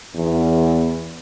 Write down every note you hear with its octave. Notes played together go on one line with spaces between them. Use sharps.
E2